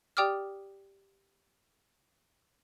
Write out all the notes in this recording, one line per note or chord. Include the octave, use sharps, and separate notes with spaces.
G4 D5 G5 D6 D#6 F6